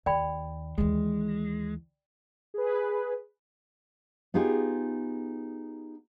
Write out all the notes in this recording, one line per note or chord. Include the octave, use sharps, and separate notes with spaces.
D#2 D5 G5 B5
D#2 E3 G#3
G#4 B4
B3 D#4 F4 G4 G#4